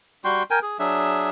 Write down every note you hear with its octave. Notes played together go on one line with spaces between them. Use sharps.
G3 F#4 G5 C6
A#4 G5 G#5
G#4
F#3 D4 G#4 E5